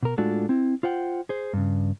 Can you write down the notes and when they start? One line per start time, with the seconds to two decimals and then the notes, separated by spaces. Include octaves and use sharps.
0.03 B2 A#4
0.18 A2 G#3 D4 F4 F#4 A4
0.49 C4 E4
0.83 F4 C5 F#5 G5
1.29 G#4 C5
1.53 G2 C#3